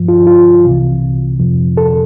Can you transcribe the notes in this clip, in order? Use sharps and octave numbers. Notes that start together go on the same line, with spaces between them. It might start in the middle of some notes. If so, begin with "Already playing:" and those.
Already playing: G2 F3
F4
F4
C2 C3 E3
F2 C3 F3
A4